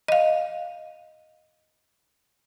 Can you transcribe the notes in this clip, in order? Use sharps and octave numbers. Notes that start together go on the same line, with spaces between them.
D#5 F5